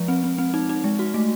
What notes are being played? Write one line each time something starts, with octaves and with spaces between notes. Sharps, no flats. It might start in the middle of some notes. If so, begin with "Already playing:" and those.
Already playing: F3 G#3
C4
C4
C4
D#4
D#4
G#3
F#4
A3